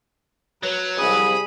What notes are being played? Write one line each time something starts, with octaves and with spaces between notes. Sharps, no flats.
F#3 B4
C2 G#4 B5 D#6